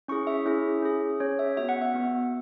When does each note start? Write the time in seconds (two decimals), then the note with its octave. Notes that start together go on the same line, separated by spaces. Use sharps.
0.08 C#4 E4 G#4 C#6
0.27 E5
0.46 C#4 E4 G#4 E5
0.82 C#4 G#4
1.20 C#4 G#4 C#5
1.39 E5
1.57 B3 F#4 E5
1.69 F#5
1.82 E5
1.94 B3 F#4